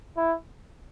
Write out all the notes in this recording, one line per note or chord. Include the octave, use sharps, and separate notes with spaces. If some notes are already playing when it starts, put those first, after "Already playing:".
E4